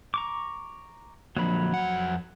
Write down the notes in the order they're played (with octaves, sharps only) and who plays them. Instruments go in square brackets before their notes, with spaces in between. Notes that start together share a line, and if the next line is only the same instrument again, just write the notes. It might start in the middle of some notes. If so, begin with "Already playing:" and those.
[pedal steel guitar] A#5 C#6 D6
[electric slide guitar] D3 F3 A#3 [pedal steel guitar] F#3 B5
[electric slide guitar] F2 F#5